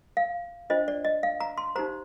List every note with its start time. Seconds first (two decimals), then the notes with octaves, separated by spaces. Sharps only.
0.17 F5
0.70 D4 F4 C5 D#5
0.88 D5
1.05 D#5
1.23 F5
1.40 A#5
1.58 C6
1.76 D#4 G4 C5 A#5